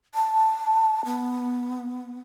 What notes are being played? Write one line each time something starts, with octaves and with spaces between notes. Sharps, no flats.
A5
B3